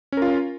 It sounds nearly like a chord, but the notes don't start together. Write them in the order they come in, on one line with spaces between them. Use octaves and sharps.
C#4 A#4 F4